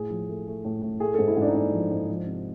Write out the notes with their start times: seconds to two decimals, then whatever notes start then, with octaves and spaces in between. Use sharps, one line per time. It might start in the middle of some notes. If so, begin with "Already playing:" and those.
Already playing: A2 G#4
0.10 F3
0.28 A3
0.47 A3
0.65 A2
0.82 A2
1.00 A3 G#4
1.14 G#2 A4
1.28 E4
1.37 G#2 D4
1.48 D#4
1.55 G#2 D4
1.73 F3
1.91 G#2
2.09 F3
2.27 C3